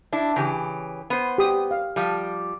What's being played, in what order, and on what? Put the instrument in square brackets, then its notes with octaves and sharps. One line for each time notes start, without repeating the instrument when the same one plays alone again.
[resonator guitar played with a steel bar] D4 E4
C#3 E3 G4
B3 C5
[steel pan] G4 D#6
F5
[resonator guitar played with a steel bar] F3 G3